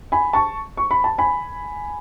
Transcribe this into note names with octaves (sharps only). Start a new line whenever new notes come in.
G#5 B5
A5 C#6
C#6
B5
A5
G#5 B5